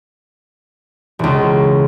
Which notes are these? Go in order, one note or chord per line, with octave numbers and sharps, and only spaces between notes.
E1 C#2